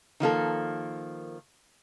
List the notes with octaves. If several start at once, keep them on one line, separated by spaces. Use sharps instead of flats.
D#3 F3 A#3 A4